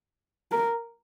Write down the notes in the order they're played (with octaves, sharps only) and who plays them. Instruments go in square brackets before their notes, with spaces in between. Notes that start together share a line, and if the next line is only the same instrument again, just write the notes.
[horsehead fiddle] A#4